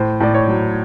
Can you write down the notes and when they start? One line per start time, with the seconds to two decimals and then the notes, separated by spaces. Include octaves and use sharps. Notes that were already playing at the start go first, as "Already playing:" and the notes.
Already playing: A2 C5
0.20 A2 D5
0.34 C#5
0.48 F#3